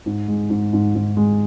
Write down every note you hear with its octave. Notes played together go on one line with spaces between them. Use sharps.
G#2
G#3
G#2
G#2
G#2
G#3